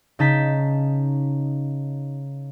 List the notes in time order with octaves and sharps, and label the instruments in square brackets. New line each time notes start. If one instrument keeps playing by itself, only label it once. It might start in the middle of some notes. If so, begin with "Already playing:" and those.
[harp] C#3 D#4 A5 G6 B6